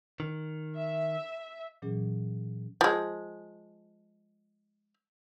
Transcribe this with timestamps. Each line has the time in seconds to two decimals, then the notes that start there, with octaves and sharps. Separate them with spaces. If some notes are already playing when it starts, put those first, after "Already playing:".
0.20 D#3
0.77 E5
1.82 A#2 E3 F#3 C#4 G#4
2.81 F3 G#3